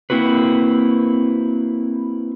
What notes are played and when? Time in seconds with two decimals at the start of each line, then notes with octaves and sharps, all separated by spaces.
0.10 A#3 C4 E4 F#4 B4